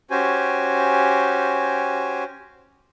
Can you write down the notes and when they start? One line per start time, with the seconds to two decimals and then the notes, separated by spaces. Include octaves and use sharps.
0.11 C#4 F#4 G4 C5 G#5